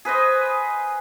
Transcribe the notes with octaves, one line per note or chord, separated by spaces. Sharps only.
G#4 B4 C5 D#5